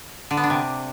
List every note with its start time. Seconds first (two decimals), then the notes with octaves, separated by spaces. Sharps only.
0.31 D3
0.37 B3
0.44 D4
0.50 C3